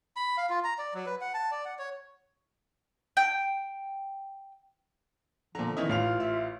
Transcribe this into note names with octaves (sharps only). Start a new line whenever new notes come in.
B5
F5
F4
A#5
D5
F#3
B4
F#5
A5
D5
F#5
C#5
G5
A#2 D3 F3 A#5
D#3 E3 C#4 E4 D#5
A1 A2 F4 F5 F7
E5